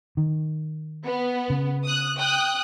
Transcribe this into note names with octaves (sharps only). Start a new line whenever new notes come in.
D#3
B3
C#3
D#6 F#6
G5 D#6 F#6